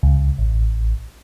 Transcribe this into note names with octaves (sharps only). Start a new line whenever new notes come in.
C#2
A1